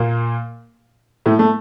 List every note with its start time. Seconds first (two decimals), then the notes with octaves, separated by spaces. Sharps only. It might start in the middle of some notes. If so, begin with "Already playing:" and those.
Already playing: A#2 A#3
1.26 A2 A3
1.39 A3